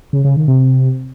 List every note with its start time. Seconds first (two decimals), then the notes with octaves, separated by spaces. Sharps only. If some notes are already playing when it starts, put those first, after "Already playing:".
0.13 C#3
0.24 C#3
0.36 D#3
0.48 C3